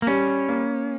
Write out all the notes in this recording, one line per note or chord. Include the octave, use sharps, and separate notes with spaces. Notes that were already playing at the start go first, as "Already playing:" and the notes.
A#3
G3 C#4
A#3